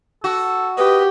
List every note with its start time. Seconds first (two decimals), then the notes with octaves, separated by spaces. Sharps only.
0.24 F#4 A4
0.78 G4 B4 D#5